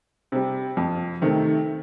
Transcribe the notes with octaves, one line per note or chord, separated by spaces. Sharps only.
C3 G3
F2
C3 D#3 A3